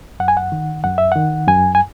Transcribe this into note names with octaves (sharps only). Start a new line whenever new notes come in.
F#2 F#5
G#5
F#5
D#3
F#2 F#5
E5
D#3 F#5
F#2 G#5
G#5